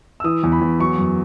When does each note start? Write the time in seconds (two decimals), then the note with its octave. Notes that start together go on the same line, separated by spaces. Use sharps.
0.20 E6
0.24 E3 D#6
0.43 E2
0.52 B5
0.61 E2
0.80 F#3 C#6
0.98 F#2